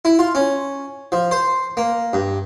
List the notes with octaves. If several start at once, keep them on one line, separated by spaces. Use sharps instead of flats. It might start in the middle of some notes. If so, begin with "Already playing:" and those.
E4
F4
C#4
F3
C5
A#3
G2